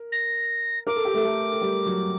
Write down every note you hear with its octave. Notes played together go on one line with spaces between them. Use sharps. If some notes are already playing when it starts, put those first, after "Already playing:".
Already playing: A#4
A#6
A#4 D6
A4
G4
A3 A4
A3 A4
A4
G3 G4
F#3 F#4